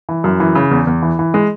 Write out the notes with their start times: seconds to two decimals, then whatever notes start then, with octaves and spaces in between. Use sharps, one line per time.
0.09 E3
0.24 F#2
0.40 E3
0.55 C#3
0.71 E2
0.87 E2
1.02 E3
1.19 E3
1.34 G#3